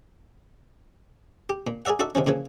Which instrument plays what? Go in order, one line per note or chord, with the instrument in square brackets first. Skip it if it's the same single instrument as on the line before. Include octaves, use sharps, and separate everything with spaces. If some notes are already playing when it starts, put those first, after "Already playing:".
[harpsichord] G4
A#2
G#4 A#4 D5 E5 F#5
D#4 F#4 A4 D5 E5
C3 D#3 F3 C#4
A#2 C#3 E3 F3